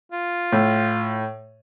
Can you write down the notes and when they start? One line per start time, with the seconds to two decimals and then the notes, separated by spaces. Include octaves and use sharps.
0.12 F4
0.52 A2